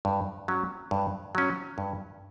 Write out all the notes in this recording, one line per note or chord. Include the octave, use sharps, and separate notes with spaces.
G2
F#3 C#4
G2
F#3 C#4
G2